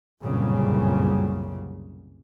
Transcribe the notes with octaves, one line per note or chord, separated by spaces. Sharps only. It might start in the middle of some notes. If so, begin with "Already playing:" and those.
G1 C2 F#2 A#2 C#3